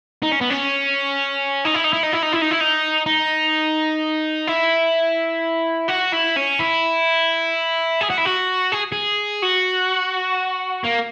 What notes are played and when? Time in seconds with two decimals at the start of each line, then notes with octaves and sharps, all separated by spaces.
0.23 D#4
0.32 C#4
0.41 B3
0.50 C#4
1.65 D#4
1.74 E4
1.84 D#4
1.93 E4
2.03 D#4
2.13 E4
2.22 D#4
2.32 E4
2.41 D#4
2.51 E4
2.60 D#4
3.06 D#4
4.47 E4
5.89 F#4
6.13 E4
6.37 C#4
6.60 E4
8.01 G#4
8.10 F#4
8.18 E4
8.25 F#4
8.72 G#4
8.92 G#4
9.43 F#4
10.84 A#3